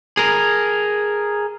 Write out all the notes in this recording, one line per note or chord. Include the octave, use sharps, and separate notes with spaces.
G#4 A#4